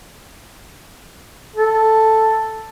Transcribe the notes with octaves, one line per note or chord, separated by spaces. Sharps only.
A4